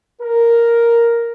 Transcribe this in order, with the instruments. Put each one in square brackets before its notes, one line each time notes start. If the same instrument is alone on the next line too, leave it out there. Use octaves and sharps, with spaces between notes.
[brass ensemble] A#4